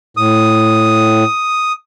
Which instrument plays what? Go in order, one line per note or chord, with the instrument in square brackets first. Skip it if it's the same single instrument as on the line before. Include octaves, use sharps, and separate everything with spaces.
[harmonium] A2 [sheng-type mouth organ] D#6